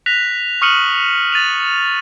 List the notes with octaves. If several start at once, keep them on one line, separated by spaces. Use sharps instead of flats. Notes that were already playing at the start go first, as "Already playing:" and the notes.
F#6 A#6 B6 F7
C#6 D#6 F6 C#7 D#7 F#7
A6 D#7 F7